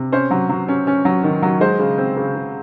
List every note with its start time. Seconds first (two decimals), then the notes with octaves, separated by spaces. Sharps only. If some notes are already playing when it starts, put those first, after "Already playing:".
Already playing: C3
0.12 C#4 C5
0.31 F#3
0.49 F#3
0.68 C#4
0.87 C#4
1.05 F#3
1.24 D#3
1.42 F#3
1.61 G#3 C5
1.79 C#3
1.98 C4
2.17 C#3
2.35 C#3